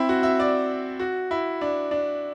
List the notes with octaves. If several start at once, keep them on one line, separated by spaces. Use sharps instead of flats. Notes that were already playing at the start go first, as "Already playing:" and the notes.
Already playing: C4 E4
F#4
E5
D5
F#4
E4
D4
D4